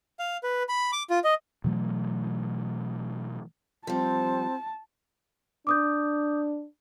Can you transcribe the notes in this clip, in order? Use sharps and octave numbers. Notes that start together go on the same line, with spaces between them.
F5
B4
B5
D6
F4
D#5
B2 E3 F#3 A3
F3 G3 C4 A5
D4 D6 D#6 G6